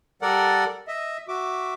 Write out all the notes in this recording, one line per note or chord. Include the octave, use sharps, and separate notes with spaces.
G3 A4 A#4 D5 F#5
D#5 E5
F#4 E5 D6